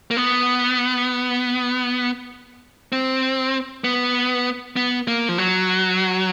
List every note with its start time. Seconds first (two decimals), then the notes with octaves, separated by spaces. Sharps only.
0.11 A#3
0.17 B3
2.92 C4
3.84 B3
4.76 B3
5.08 A#3
5.29 F3
5.38 F#3